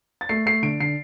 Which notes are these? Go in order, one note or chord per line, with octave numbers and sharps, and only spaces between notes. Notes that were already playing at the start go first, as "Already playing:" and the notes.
A6
A3 C7
A3 C7
D3 D7
D3 C7